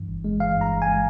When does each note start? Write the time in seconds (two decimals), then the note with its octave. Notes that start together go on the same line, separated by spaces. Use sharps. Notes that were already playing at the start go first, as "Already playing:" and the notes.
Already playing: G2 E3
0.08 G1
0.25 G#3
0.40 E3 F5
0.56 G2
0.61 A#5
0.71 G1
0.82 G#5
0.87 G#3